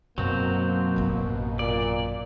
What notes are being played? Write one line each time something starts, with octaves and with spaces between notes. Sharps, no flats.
F#2 B2 F#3 A#3 C4
A1 F#2
A#2 D5